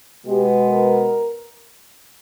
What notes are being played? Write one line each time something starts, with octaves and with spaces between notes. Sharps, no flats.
B2 G#3 B3 G4
A#4